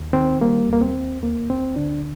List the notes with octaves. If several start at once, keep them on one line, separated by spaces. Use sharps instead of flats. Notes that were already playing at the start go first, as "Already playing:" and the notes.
Already playing: D#2
D#3 C4
G3 A#3
D#2 A#3
C4
D#2
D2 A#3
D2 C4
D3 D4